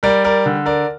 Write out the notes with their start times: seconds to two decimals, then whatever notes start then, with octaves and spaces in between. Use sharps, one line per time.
0.03 G3 A#4 D5
0.24 A#4 D5
0.46 D3
0.66 A#4 D5